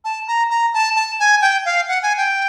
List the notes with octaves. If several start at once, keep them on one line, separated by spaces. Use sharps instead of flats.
A5
A#5
A#5
A5
A5
G#5
G5
F5
F#5
G#5
G5